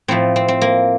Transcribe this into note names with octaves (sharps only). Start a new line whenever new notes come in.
A2 F3 A3 C4
C4
C4
A#3